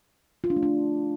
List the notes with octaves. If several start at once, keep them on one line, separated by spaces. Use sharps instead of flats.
F4
D4
A3
D4